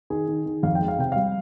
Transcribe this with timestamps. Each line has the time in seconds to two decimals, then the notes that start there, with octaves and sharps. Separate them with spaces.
0.10 D#3 G#4
0.28 D#3
0.46 D#3
0.63 F2 F5
0.75 G5
0.81 G#3
0.88 F5
0.99 C3 G5
1.12 G3 F5